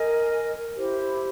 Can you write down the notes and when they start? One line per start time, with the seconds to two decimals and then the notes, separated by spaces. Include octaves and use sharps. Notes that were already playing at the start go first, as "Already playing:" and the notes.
Already playing: A#4 D#5 G#5
0.76 E4 G4 C5